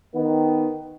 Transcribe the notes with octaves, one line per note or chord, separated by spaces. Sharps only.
D#3 B3